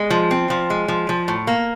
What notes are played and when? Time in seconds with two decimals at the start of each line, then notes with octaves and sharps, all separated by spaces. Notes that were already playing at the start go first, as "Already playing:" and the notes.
Already playing: G#3
0.10 F3
0.31 C4
0.50 F3
0.70 G#3
0.88 F3
1.09 F3
1.28 A2
1.47 A#3